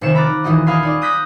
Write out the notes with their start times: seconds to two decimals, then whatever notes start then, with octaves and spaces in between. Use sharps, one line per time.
0.01 F1 C3 D#3 C#7 E7
0.14 A#5 B5 D6 F6 F#6 A6
0.44 D#1 E3 D#4 F#4 D#5
0.66 D#5 F5 G#5 B5 C6 D#6
0.83 D#4 D5 D#5
1.02 D#6 F#6 G6 A#6 B6